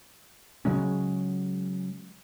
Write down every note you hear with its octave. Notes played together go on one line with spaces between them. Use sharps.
C#3 F#3 G#3 C#4